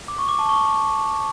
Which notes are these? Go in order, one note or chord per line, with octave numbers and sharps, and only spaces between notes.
D6
C#6
D6
A5
C#6